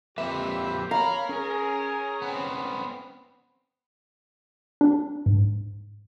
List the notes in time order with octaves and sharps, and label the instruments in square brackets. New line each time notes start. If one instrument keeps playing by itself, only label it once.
[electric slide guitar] F2 A#3 B4 [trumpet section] C4 G4 [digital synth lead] E5
[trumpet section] C#4 C#5 B5 [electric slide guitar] A#4 [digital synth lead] F5 [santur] A#5
[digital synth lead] C#4 [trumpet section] G#4
[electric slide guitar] B3 C4
[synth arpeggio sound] D4
G#2